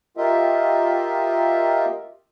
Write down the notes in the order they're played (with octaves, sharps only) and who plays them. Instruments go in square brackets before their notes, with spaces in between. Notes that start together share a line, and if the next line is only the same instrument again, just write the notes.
[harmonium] F4 G4 A#4 D#5 E5